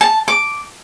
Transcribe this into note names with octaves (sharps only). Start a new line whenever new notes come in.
A5
D6